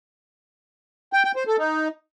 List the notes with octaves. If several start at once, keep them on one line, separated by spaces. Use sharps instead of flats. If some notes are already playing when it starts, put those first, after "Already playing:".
G5
G5
C5
A4
D#4